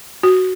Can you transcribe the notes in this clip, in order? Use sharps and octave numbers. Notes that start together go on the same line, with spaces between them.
F#4